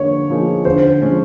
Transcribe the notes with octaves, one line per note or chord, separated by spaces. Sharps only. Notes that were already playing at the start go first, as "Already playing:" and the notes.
Already playing: D3 F3 A#3 D#4 G#4 C#5
F3 A#3 D#4 G#4
D3 C5
F3 G#3 C#4